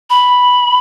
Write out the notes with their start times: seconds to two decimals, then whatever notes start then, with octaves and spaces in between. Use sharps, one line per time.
0.10 B5